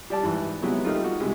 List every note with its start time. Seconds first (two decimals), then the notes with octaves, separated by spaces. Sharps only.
0.10 G3 D5 A5
0.23 G#2 E3
0.62 C3 F#3 G#3 B3 E4
0.85 D#3 G3 A3 D#4 F4
1.04 F#4
1.20 C2 C3 G#3